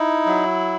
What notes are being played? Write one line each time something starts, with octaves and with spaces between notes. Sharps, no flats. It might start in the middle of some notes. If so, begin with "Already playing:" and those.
Already playing: D#4 E4
F#3